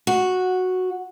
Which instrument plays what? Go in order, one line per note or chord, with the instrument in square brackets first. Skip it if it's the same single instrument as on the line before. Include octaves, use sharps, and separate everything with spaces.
[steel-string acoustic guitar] F#4